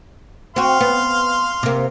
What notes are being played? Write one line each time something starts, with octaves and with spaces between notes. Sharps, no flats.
C4 F#4 F5 C6
B3
C3 A#3